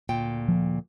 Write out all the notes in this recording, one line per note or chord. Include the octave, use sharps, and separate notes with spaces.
D2 A#2 G5
F3